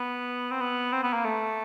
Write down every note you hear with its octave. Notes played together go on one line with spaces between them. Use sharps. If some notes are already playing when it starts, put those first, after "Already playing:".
Already playing: B3
C4
B3
C4
B3
A#3
A3